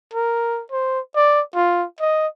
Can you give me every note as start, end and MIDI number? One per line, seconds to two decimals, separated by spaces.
0.14 0.62 70
0.72 1.00 72
1.16 1.41 74
1.55 1.85 65
2.01 2.27 75